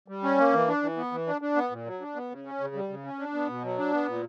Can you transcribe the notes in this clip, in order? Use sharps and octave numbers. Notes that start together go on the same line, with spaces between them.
G3
C#4
A#3
E3
D4
E3
B3
E3
D4
D4
B3
A#2
F#3
D4
B3
C#3
C#4
C#3
G3
C#3
C#4
D4
B3
B2
F#3
D4
B3
A#2